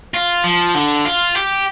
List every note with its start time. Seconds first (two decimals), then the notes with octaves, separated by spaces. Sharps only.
0.14 F4
0.44 F3
0.75 D3
1.05 F4
1.35 G4